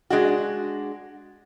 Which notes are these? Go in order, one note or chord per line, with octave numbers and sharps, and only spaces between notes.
G#3 D4 F#4